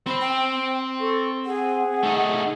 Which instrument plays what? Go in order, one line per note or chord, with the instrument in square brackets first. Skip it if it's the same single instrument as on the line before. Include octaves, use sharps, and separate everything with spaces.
[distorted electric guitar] C4 C5 [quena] B5
[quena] G5
[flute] A4 [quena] C#6
[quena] G#4 [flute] F#5
[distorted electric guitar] A3 D#4